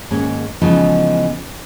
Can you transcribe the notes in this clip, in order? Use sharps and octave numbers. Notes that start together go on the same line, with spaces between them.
D#2 G#2 G#3 A#3 C#4 C#5
C#3 E3 F3 G#3 B3 D#4